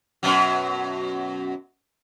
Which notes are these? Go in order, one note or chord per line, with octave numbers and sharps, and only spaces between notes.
F#2 B2 F#3